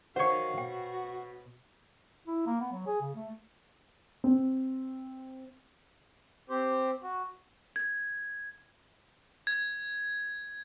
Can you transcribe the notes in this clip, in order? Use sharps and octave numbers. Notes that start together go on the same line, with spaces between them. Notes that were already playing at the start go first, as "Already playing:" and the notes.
D#3 F#4 C5 C#5 F5 F#5 C#6
B2 G5
E4
A#3
B3
F#3
G#4
C#3
A3
C4
C4 G4 C5
F#4
G#6
G#6